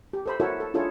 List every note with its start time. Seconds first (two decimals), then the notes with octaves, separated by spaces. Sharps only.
0.13 G4
0.26 A4 C5 B5
0.40 E4 F#4 A4 A#4 C#5 E5
0.60 A4
0.74 D4 E4 F4 G#4 A4 C#5